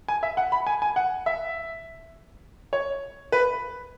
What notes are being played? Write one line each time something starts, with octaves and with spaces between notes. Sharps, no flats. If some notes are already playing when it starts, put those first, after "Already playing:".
G#5
E5
F#5
B5
G#5
G#5
F#5
E5
C#5
B4